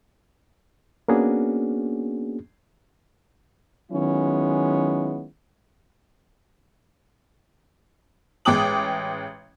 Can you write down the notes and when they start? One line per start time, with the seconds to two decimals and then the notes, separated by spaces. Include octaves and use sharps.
1.08 A#3 B3 C#4 D4 F#4 G#4
3.91 D#3 F#3 G#3 B3 C#4 E4
8.45 A1 G#3 G5 D6 D#6 F#7